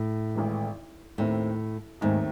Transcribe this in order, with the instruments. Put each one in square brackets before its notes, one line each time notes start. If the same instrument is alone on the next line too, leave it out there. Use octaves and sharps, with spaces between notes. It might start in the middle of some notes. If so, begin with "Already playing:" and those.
Already playing: [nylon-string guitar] A2
[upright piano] G#1 G#2 E3
[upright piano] D#2 D#3 A3 C4 [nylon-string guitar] A2
[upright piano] D#2 D#3 A3 C4 [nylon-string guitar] G#2